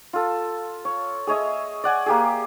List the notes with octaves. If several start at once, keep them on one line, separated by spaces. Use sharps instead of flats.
F4 A4
C#5
G#4 C#5 D#5 E5
D5 F#5 G#5
A#3 G4 G#4